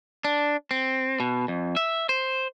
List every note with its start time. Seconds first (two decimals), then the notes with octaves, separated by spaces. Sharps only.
0.24 D4
0.71 C4
1.20 B2
1.48 F2
1.76 E5
2.09 C5